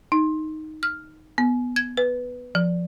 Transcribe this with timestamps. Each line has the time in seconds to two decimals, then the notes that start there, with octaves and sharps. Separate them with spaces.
0.12 D#4
0.83 F6
1.38 B3
1.76 G#6
1.97 B4
2.55 F3